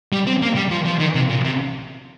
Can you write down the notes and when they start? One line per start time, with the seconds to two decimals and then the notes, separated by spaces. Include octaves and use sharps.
0.13 G3
0.27 C4
0.42 A#3
0.56 G3
0.71 F3
0.86 F3
1.00 D#3
1.15 C3
1.30 A#2
1.45 C3